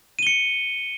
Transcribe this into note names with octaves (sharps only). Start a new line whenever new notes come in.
C#7 D#7 G7